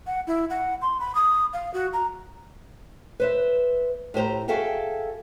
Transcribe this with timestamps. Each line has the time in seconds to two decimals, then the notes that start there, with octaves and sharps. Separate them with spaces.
0.07 F#5
0.27 E4
0.50 F#5
0.82 C6
1.00 B5
1.15 D#6
1.53 F5
1.74 F#4
1.93 A#5
3.20 B4 C5 E5
4.14 A2 G4 C5 A#5
4.48 F#4 G#4 A4 E5 F5 G5